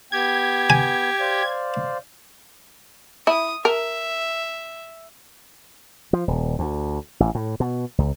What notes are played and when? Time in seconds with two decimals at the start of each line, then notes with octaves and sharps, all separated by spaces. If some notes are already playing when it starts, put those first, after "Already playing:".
0.12 B3 G4 G#6
0.70 G#5
1.20 C5 D5 F5
3.27 E4 D#6
3.65 A#4 E5
6.13 F3
6.28 D#1
6.59 D2
7.20 A1
7.35 A2
7.60 B2
7.98 C#2